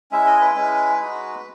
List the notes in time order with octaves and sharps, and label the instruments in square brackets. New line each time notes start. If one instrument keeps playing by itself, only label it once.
[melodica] G#3 C#4 E4 E5
D#5
B4
G#3 C#4 E4
G#3 D#4 F#4